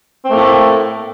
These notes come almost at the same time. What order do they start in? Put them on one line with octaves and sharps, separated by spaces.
C4 A3 A#3 A2